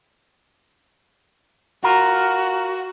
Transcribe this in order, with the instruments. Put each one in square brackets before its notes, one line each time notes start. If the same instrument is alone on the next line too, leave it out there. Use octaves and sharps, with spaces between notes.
[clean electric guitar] F4 A#4 [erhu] F#4